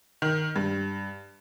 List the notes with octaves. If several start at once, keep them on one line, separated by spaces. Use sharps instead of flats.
D#3
G2